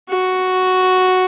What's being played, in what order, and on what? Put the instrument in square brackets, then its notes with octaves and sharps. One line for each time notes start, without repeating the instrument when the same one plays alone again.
[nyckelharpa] F#4